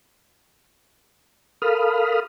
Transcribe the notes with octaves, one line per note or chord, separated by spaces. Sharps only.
A4 A#4 F5 B5 D#6 F6